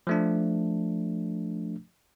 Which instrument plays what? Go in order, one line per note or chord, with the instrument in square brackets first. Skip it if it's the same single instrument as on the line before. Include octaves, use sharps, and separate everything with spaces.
[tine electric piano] F3 A3 D4